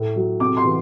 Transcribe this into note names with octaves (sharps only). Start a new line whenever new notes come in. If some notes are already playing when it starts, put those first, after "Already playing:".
Already playing: A2
F#3
C3 D6
C6
E3